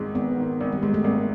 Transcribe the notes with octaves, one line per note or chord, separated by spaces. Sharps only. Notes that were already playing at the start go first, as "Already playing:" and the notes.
Already playing: G#1 G#2 D#3
G#1 B3
D#3
G#1
G3
G#2 G#3
A3
G#1 A#3